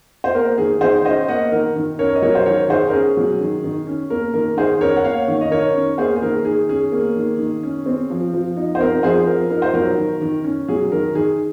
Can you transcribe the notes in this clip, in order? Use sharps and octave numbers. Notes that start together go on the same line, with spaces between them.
C5
A#3 A#4
D#3 G#4
D#3 G#4 C5
C#4 C5 D#5
A#3 D#5 F#5
D#3 A#4
D#3
C#4 A#4 C#5
D#5
F#3 A#4 C#5
C5
D#3 A#4 C#5
D#3 G#4 C5
A#4
C#4 G#4
F#3
D#3
D#3
C#4
A#3 A#4
D#3 A#4
D#3 G#4 C5
C#4 A#4 C#5
F#5
A#3 C#5 F5
D#3
D#5
D#3 A#4 C#5
C#4
A#3 G#4 C5
G#4
D#3 A#4
D#3 G#4
C#4 G#4
A#3
D#3
D#3
C#4
C4
F3
F3
D#4
C5
C4 A#4
F3 G#4 C5
F3 A#4
D#4 A#4
C5
F#3 A#4
D#3
D#3
C#4
F#3 G#4
D#3 A#4
D#3 G#4